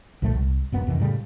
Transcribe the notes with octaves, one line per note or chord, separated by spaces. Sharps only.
B1 A#2 F3 A3
C2
D1 F#2 B3
F2 C3 D#3 E3
A2 C#3 G3